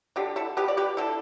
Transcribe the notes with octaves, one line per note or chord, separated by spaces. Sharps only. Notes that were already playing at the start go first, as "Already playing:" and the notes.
D3 D4 G4
E4 A4
B3 G4 B4
D5
G4 B4
D3 E4 A4